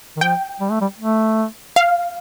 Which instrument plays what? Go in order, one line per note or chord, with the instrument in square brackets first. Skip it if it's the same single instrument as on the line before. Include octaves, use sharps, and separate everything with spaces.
[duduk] D#3
[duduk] F3 [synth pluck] G5
[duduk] G3
A3
G3
A3
[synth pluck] F5